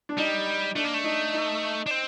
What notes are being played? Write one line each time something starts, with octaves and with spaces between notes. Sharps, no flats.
D4
G3 D#4
A3 D4
A#3
A3
D#4
D#4
D4
C4